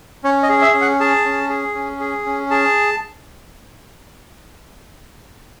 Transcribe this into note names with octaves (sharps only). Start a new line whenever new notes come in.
C#4 C#5
D#5
G#4
E5
C#4
F#5
G#4 A5
C#4
G#4
C#4
G#4
C#4
G#4 A5